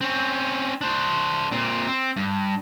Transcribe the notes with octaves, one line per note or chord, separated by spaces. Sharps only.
C4 C#4
D4 C5
A#2 C4
C4
G2